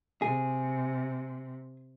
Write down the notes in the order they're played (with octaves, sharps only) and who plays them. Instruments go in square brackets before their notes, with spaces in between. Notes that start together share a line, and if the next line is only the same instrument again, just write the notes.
[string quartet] C3 [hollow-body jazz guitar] G#4